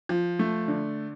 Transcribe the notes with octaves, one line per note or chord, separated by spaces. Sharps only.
F3
A3
D3